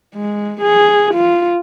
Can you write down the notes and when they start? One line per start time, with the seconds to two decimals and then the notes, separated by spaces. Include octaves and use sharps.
0.15 G#3
0.61 G#4
1.14 F4